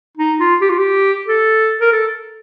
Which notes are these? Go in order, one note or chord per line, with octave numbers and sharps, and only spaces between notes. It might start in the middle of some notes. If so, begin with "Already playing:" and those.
D#4
F4
G4
F4
G4
A4
A#4
A4